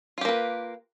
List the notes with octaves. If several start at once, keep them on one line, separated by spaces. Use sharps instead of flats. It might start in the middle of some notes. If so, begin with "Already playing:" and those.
A#3 F4 G4 B4